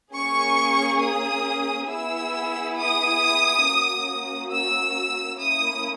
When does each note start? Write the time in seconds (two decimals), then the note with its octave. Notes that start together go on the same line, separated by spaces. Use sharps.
0.12 A#3 C#4 G#4 C#6
1.00 D#6
1.88 B3 E4 G#4 E6
2.77 D#6
3.65 A#3 C#4 F#4
4.53 E6
5.41 A#3 C#4 E4 D#6